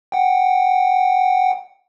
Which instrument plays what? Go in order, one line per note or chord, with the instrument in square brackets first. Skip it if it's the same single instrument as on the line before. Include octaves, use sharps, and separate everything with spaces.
[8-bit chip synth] F#5 G5